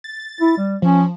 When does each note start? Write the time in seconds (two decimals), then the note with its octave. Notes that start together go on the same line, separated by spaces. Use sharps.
0.04 A6
0.41 E4
0.57 G3
0.82 F3 C#4